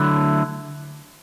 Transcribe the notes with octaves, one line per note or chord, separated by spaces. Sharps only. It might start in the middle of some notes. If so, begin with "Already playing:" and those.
Already playing: D3 F#3 A3 E4